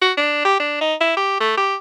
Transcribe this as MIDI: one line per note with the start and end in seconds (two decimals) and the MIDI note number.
0.02 0.12 66
0.18 0.41 62
0.45 0.56 67
0.60 0.77 62
0.81 0.94 63
1.01 1.14 64
1.17 1.39 67
1.40 1.54 57
1.57 1.75 67